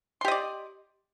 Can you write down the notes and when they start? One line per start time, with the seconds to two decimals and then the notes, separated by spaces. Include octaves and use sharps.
0.21 C6
0.25 G4
0.28 D#5
0.31 D5